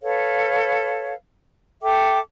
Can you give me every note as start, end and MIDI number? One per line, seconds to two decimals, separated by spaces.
0.02 1.14 69
0.02 1.14 71
0.02 1.14 73
0.02 1.14 77
1.82 2.19 69
1.82 2.19 76
1.82 2.19 79
1.82 2.19 86